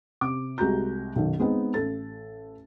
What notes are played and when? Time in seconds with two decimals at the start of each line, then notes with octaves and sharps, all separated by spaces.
0.21 C3 D6
0.58 C2 G#3 F#4 G4 A#5 G6
1.16 B1 F#2 D#3
1.39 G#3 B3 C4 D#4 G#4
1.74 A1 A4 A6